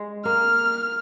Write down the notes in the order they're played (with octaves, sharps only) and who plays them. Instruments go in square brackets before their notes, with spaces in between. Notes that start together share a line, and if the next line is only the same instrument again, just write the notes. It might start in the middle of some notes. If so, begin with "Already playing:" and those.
Already playing: [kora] G#3
[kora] A#3 [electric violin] F6